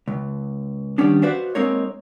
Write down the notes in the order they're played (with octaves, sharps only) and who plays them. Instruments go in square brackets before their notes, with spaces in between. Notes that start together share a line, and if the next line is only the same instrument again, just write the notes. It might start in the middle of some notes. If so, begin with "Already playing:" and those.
[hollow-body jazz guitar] C#2
D#3 F3 G3 B3 C#4 D4
F#4 B4 C5 D5 E5 F5
G#3 A#3 C4 D#4 A#4 C#5